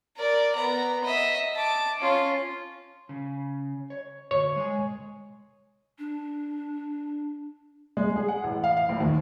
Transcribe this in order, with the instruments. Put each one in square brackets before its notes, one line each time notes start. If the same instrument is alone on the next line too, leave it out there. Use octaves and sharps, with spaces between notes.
[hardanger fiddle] A#4 D5
B3 A#5
D#5 E5
A5 D6
C#4 F4
[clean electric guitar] C#3
C#5
[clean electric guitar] D2 [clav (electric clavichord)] C#5
[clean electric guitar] G#3 G#5
[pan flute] D4
[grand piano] G#3
G#4
F#5
A1
F5
F5
A#1
D#2